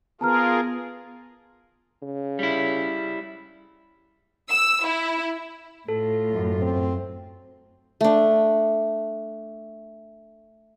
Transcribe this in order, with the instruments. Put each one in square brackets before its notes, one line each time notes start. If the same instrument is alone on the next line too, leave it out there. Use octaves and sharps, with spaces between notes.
[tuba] B3 [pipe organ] F4 G#4 A#4 [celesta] A5 A#5 F6
[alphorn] C#3
[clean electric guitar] G3 E4
[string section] E6
E4
[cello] A2 F4 [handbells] A4
[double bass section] F#2
[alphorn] C4
[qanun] A3 D4